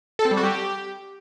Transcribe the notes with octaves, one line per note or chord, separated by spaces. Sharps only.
A4
C4
G3
F#4
G4